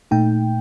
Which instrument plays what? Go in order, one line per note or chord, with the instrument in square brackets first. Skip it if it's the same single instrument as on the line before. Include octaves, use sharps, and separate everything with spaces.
[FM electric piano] A#2 A3 D#4 G5